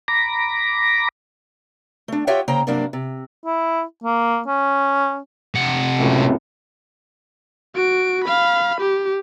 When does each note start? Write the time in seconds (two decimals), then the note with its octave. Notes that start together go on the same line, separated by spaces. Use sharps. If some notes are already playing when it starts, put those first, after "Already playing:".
0.08 A#5 B5 D6 A#6
2.08 A3 D4
2.27 F4 G4 C#5 E5 F#5 G5
2.48 C#3 A#3 C5 G5 A#5
2.67 G2 C3 F#3 A#3 D4
2.93 C3
3.46 E4
4.04 A#3
4.47 C#4
5.55 C3 F#5
5.99 C#2 F#2 A2
7.75 F#4 D7
8.24 F5 B5
8.81 G4